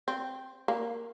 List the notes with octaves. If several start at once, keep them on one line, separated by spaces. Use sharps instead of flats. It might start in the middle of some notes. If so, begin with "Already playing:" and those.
C4
A#3